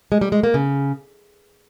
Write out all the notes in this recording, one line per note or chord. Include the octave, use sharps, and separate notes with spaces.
G#3
G3
G#3
A#3
C#3